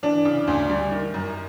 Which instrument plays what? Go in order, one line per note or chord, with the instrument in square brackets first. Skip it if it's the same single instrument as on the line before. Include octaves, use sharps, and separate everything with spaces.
[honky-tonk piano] E3 D4
C#3
D2
G3
D#3
F#2